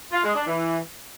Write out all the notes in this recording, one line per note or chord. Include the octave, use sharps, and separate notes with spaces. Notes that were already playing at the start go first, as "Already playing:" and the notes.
F4
G#3
D4
E3